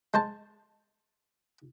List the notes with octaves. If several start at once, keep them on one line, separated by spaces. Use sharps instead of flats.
G#3 C5 A5